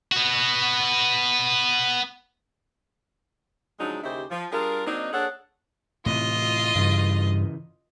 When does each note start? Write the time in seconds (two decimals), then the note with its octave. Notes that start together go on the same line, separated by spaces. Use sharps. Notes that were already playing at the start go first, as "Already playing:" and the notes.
0.12 B3 F#4
3.80 C#3 F3 F#3 G#3 D4 D#4
4.03 D#2 C#3 D#4 E4 G4 C5
4.31 F3
4.51 G3 D4 F4 G#4 A#4
4.87 F#3 A#3 C4 D4 D#4
5.13 A#3 D4 G#4 A4 C#5 F#5
6.06 A2 C3 E3 F4 D#5
6.75 G2 C#3 E3